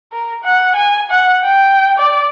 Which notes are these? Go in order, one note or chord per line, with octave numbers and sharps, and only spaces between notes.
A#4
F#5
G#5
F#5
G5
D5